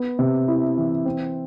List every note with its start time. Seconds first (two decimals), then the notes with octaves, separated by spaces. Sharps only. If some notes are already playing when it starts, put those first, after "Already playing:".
Already playing: B3
0.19 C3
0.48 E4
0.77 E3
1.05 C4